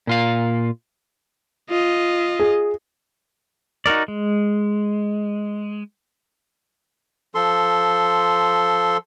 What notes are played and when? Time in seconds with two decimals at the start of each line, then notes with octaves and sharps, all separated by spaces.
0.07 A#2 F4 F5
1.70 F4 D#5
2.40 G#4
3.86 D#4 F#4 A#4 D5
4.08 G#3
7.35 F3 A4 C6